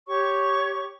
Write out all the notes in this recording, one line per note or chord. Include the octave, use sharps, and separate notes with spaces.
G4 C#5 C#6